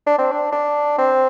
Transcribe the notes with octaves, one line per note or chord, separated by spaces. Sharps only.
D4
C4
D4
D4
C4